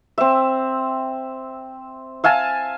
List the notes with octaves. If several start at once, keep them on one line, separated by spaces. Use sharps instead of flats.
C4 E5
E5 F5 G#5 A5